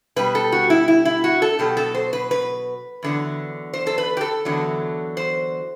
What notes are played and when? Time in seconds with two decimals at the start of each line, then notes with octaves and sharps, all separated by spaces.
0.16 B2 G3 B4
0.35 A4
0.52 F#4
0.70 E4
0.88 E4
1.05 E4
1.24 F#4
1.42 A4
1.59 B2 F#3 G4
1.77 A4
1.95 C5
2.13 B4
2.31 B4
3.03 E2 D3 F#3
3.73 C5
3.87 A4
3.98 B4
4.17 G4
4.21 A4
4.45 E2 D3 F#3
5.17 C5